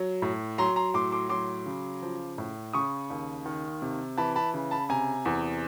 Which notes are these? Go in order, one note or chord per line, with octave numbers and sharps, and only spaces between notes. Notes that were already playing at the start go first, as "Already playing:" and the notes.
Already playing: F#3
A2
F#3 A#5 C6
A#5 C6
A2 C6 D6
C6 D6
F#3 C6 D6
C#3
F3
A2
C#3 C#6 D#6
D#2
D#3
C3
E3 A5 B5
A5 B5
C#3
A5 B5
C3 G#5 A#5
E2